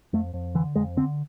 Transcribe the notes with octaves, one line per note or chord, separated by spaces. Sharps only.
F2 A3
F2
D3 E3
F2 G#3
D3 C4